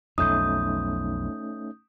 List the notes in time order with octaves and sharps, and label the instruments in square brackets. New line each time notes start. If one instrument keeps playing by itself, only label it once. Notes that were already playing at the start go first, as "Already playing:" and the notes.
[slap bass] B1 F2 [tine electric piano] A3 C#4 D#4 [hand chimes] D#6 G6